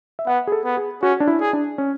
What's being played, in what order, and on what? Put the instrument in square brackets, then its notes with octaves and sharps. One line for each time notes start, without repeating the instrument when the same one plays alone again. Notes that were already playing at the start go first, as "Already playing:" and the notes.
[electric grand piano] E5
[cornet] B3 [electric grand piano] F#5
[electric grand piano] G#4
A4
[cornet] B3
[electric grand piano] G#4
[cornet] C#4 [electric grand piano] F#4
[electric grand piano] D4
E4
[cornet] G#4
[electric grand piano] D4
C#4